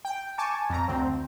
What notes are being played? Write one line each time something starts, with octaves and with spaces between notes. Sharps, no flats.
G5
G#5 A5 C#6 D6
F2 A#5
D2 C4